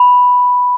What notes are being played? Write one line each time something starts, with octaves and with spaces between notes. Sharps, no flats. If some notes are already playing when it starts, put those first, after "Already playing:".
Already playing: B5